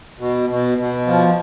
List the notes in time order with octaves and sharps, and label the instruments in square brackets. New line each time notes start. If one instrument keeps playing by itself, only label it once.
[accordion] B2
B2
B2
F3